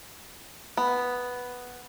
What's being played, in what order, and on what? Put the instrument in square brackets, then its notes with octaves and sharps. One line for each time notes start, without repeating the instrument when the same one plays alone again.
[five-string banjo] B3